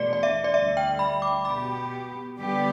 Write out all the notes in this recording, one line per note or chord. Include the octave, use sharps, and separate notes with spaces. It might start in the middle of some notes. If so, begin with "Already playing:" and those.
Already playing: E2 B2 A3 D4 D5
D5
E5
D5
D2 D3 G3 E5
G5
B5
D6
B2 B3 G4 B5
D3 G3 B3 G4